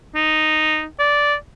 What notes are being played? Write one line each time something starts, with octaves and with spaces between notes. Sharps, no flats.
D#4
D5